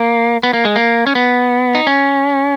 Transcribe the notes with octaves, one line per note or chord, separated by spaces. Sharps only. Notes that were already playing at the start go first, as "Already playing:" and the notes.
Already playing: A#3
B3
A#3
G#3
A#3
C#4
B3
D#4
C#4